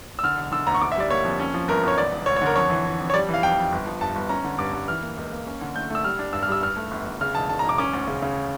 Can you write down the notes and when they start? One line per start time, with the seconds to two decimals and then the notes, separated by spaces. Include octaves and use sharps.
0.19 E6
0.23 D3 F6
0.38 E1
0.52 D3 E6
0.67 D2 A#5
0.74 C#6
0.81 D3 D6
0.92 E5
0.96 G3 D5
1.10 A#3 C#5
1.24 F2
1.40 C#4
1.54 F3
1.68 G1 A#4
1.83 G1 C#5
1.97 E1 D5
2.12 E1
2.26 D2 C#5
2.36 C#5
2.42 D3 A#4
2.56 F2 C#5
2.70 E3
2.85 E3
2.99 F2
3.10 C#5
3.14 G3 D5
3.29 E3 F5
3.42 F2 G5
3.57 F2
3.72 G1
3.86 F3
4.01 G2 A5
4.16 G1
4.29 C#4 A#5
4.44 D3
4.59 G2 D6
4.73 G2
4.88 E3 F6
5.03 A#3
5.17 C#2
5.32 A#3
5.47 C#4
5.61 D3
5.76 A3 G6
5.90 A3 E6
6.04 G3 F6
6.19 D4
6.33 G2 E6
6.43 F6
6.48 G3 E6
6.62 G2 F6
6.76 A3
6.91 G1
7.06 G1
7.21 C#3 F6
7.35 E1 A5
7.49 E1 A5
7.59 A#5
7.64 E1 D6
7.78 C#4 D6
7.93 D2
8.07 C#3
8.22 C#3